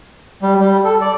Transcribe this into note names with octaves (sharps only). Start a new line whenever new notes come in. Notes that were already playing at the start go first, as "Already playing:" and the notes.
G3
G3
A4
D5